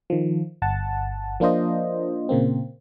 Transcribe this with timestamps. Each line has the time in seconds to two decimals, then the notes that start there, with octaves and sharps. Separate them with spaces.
0.10 D#3 F3
0.62 G1 F#5 A5
1.40 F3 A#3 D4 F4 C5 D#5
2.29 A#2 C#3 A#3 C4